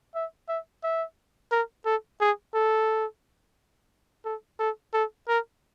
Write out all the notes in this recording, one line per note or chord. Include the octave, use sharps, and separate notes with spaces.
E5
E5
E5
A#4
A4
G#4
A4
A4
A4
A4
A#4